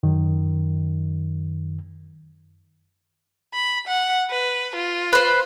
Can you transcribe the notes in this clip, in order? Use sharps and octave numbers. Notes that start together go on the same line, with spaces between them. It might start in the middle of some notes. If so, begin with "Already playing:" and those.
F#2 D#3
B5
F#5
B4
F4
B4 C5